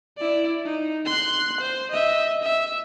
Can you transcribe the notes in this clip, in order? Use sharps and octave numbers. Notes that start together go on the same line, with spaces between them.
E4 D5
D#4
C6 F#6
C5
D#5 E5
E5